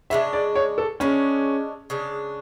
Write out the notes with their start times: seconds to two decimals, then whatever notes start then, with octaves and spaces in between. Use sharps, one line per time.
0.10 C#3 G#3 D4 E5
0.33 D5
0.55 C#5
0.78 A4
1.00 C#3 G#3 C#4 D4
1.90 C#3 G#3 D4